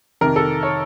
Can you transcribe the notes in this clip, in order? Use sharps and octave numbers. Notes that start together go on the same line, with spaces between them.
F2 C3 D#3 A#4
A4
C#5